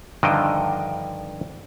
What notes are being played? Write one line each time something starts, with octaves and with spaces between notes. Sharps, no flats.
G2 D3 D#3 F3 D#5 G5